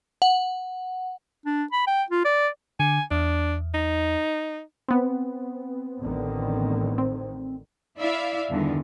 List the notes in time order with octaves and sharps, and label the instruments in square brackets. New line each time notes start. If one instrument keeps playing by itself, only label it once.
[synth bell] F#5
[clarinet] D4
B5
G5
F4
D5
[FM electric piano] D3 [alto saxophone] G#5
[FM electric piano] E2 [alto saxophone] D4
[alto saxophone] D#4
[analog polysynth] B3 C4
[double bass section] A1 D3 D#3
[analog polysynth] C4
[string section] E4 D5 E5 F5
E2 G2 D3 D#3